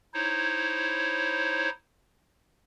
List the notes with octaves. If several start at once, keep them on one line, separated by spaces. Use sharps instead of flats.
D#4 E4 C5 C#5